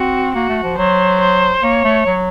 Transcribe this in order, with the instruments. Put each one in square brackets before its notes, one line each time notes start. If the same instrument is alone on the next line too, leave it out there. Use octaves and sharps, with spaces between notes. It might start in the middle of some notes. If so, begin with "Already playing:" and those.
Already playing: [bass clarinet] C4 [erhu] F#4
[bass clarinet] A#3 [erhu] F#4
[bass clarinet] A3
F3
[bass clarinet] F#3 [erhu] C5
[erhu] C5
[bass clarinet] A#3 [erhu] C#5
[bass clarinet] A3
F#3